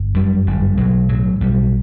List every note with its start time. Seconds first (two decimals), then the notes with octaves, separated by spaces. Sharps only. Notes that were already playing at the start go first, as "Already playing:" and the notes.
Already playing: G1
0.14 F#2 G3
0.47 G1 G3
0.77 B1 F#3
1.09 A2 F#3
1.41 B1 G3